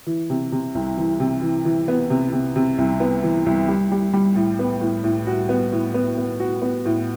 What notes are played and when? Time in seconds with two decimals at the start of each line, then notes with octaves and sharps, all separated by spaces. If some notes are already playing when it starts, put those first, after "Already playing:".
0.07 E3
0.30 C3
0.52 C3
0.75 C2
0.97 E3
1.20 C3
1.42 E3
1.65 E3
1.88 B3
2.10 C3
2.32 C3
2.56 C3
2.78 C2
3.00 B3
3.24 E3
3.46 C2
3.68 G3
3.92 G3
4.13 G3
4.36 A2
4.59 B3
4.81 A2
5.04 A2
5.27 F#4
5.49 B3
5.72 A2
5.94 B3
6.18 B3
6.40 F#4
6.62 B3
6.85 A2